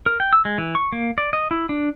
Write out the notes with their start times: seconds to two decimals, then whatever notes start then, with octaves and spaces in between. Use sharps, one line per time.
0.06 A#4
0.20 G5
0.33 E6
0.45 G#3
0.58 E3
0.75 C#6
0.93 A#3
1.18 D5
1.33 D#5
1.51 E4
1.69 D4